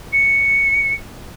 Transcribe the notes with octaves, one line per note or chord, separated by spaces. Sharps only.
C#7